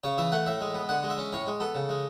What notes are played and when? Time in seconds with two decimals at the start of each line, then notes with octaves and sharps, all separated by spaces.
0.04 C#3 C#5
0.18 E3 E5
0.32 A3 F#5
0.46 A2 E5
0.61 G#3
0.74 B3
0.89 D3 F#5
1.03 G#3
1.10 E5
1.18 C#4
1.33 A2 C#5
1.47 G#3
1.60 B3 A4
1.75 C#3
1.89 G#3